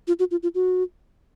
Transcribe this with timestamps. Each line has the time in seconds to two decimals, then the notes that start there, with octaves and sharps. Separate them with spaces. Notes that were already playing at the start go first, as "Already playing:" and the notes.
0.07 F4
0.19 F#4
0.31 F4
0.43 F4
0.55 F#4